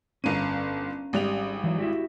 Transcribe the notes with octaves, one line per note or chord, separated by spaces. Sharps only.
G1 C#4 A#4 F5 D#7
G#1 G3 F7
E3 F#3
E4 F#4 G4